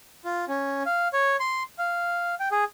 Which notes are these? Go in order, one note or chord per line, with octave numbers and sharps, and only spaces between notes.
F4
C#4
F5
C#5
C6
F5
G5
G#4